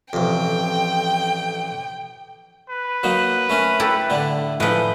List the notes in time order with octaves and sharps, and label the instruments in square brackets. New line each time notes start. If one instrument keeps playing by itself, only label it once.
[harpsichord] A1 F2 [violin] G5
[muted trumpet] B4
[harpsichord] F#3 A#3 D#4
A3 C#4 A#4
[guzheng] E4 G4 A4
[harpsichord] A2 D3 D4
[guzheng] A2 F3 [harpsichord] E3 D#4 [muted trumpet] B4